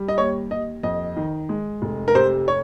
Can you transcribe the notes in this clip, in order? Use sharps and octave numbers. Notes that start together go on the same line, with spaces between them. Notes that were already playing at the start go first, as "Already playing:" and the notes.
Already playing: G3
D#5
D#2 C#5
D#2 D#5
F2 D#5
D#3
G#3
F1
A#4
C3 C5
C#5